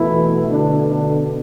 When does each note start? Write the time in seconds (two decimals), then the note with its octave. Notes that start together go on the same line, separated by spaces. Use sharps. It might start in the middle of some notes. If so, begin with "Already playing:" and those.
Already playing: B2 E3 A3 E4
0.50 D3 D4
0.88 D3 D4